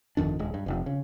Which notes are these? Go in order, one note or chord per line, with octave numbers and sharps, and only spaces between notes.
G1 F2 D#3 D4
D#1 G#3
G2
F1 F2
C#3